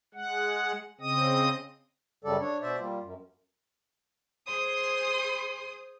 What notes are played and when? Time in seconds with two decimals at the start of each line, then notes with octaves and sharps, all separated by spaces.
0.14 G#3 F#5
1.01 C#3 C4 D#5 D#6
2.24 F#2 C#3 G3 A4 D5
2.41 D4 C#5
2.62 B2 C5 D5 E5
2.79 G3 A#3 F4
3.00 F#2
4.47 G#4 C5 C6 D#6